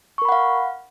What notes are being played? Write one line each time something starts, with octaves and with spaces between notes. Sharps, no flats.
A#4 F5 F#5 B5 C#6